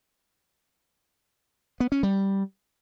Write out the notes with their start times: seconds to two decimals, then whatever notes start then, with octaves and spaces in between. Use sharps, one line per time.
1.80 B3
1.92 C#4
2.03 G3